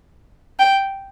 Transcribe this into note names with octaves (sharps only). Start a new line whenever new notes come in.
G5